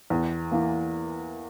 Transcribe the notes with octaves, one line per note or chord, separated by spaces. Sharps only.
E2
E3 A#3